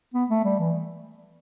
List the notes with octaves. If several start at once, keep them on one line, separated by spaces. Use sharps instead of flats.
B3
A3
G3
E3